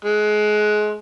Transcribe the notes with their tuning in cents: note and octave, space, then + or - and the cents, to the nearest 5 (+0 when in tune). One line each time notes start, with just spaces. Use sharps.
G#3 +25